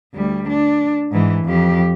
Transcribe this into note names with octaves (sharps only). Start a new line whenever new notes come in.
D2 G3
D4
G#2 E3
F2 G4